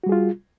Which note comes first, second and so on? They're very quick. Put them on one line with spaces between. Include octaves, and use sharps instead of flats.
F#4 G3 G#4 F4